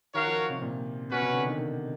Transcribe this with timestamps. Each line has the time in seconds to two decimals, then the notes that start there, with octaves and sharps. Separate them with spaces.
0.14 D#3 F#4 A#4 C#5 F5
0.26 F3
0.50 C3
0.62 A#2
1.11 B2 C#4 F#4 B4
1.22 C3
1.33 D3
1.46 D#3
1.57 D#3